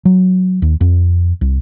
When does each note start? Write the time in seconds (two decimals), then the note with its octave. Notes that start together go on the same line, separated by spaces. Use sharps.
0.05 F#3
0.62 D#2
0.81 F2
1.41 C2